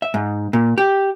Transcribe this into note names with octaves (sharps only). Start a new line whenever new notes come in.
E5
G#2
A#2
G4